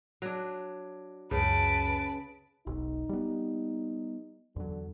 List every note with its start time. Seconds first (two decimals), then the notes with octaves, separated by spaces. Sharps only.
0.22 F#3 D4
1.31 C#2 F#2 C#3 B4 A5 D7
2.67 E1 B1 D#4
3.09 G3 B3
4.56 E2 D3 F#3